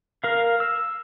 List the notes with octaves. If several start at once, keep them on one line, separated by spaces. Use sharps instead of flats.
A#4 F5
E6